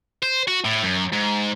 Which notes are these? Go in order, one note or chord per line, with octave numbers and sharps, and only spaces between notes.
C5
F#4
A2
F#2
G#2